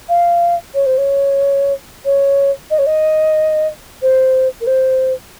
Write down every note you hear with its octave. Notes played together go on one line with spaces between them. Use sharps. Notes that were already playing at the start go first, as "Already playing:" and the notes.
F5
C#5
C5
C#5
C#5
D#5
C#5
D#5
C5
A#4
C5